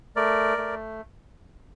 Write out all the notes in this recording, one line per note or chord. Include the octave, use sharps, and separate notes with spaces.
A3 A#4 D5
A3